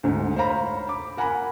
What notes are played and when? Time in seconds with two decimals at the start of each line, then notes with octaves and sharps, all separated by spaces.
0.03 D2 G#2
0.36 C5 C#5 F5 A#5 B5
0.87 B5 D6
1.17 A#4 F#5 G#5 A#5 B5